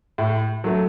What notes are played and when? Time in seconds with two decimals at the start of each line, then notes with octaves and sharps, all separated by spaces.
0.18 A2
0.64 F#3 A3